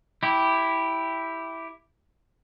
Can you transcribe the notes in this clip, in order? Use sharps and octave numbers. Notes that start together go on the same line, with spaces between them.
E4 G4